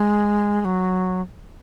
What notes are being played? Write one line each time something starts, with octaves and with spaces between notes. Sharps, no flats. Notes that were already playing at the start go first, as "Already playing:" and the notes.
Already playing: G#3
G#3
F#3